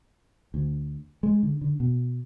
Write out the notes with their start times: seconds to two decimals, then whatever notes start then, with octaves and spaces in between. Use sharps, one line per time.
0.54 D2
1.23 G#3
1.43 D3
1.61 D3
1.80 B2